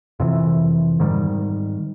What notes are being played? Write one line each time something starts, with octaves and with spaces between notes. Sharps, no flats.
F2 C3 E3
G#2 D#3 G3